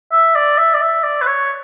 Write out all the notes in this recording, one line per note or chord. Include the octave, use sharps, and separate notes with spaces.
E5
D5
E5
D5
E5
D5
B4
C#5